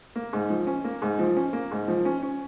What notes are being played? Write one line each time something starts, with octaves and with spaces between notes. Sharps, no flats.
A#3
G#2
F3
C#4
A#3
G#2
F3
C#4
A#3
G#2
F3
C#4
C#4